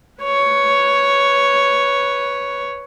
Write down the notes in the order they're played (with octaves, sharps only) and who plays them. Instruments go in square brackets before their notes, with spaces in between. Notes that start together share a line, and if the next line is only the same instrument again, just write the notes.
[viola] B4 C#5